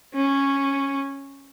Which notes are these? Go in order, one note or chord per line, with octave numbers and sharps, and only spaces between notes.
C#4